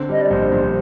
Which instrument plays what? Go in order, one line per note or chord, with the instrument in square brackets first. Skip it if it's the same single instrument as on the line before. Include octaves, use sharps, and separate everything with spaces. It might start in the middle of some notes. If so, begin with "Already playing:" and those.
Already playing: [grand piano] D3 C4
[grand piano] G3 [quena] D#5
[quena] D5
[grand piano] A#1 [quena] C5
[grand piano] A#1